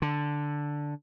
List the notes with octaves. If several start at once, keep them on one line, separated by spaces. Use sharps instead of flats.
D3